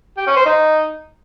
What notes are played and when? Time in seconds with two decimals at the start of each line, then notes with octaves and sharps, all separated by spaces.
0.18 G4
0.27 C#4
0.36 C5
0.45 D#4